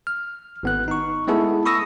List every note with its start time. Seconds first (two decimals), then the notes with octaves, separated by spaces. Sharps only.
0.07 F6
0.63 G#1 B3 F#6
0.88 D#4 C#6
1.27 G#3 A3 B3 E4 G#4 A4
1.65 B5 C#6 D#6 E6 A#6